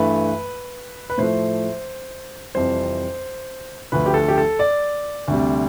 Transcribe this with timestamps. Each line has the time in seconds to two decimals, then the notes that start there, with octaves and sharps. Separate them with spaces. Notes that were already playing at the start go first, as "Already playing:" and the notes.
Already playing: G2 E3 A3 B4
1.10 B4
1.18 A2 F3 A3 C5
2.55 F2 C3 E3 G3 C5
3.92 D2 D3 F3 B4
4.06 G4
4.14 A4
4.28 G4
4.38 A4
4.59 D5
5.28 D2 C3 G3